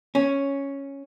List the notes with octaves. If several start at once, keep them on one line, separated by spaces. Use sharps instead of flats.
C#4